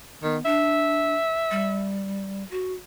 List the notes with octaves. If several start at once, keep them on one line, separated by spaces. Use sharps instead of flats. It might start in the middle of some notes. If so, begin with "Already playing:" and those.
D#3 B3
D4 E5
G3
F#4